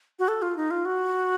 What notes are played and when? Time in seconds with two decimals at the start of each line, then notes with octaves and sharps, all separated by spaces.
0.19 F#4
0.28 A4
0.42 F4
0.56 D#4
0.71 F4
0.85 F#4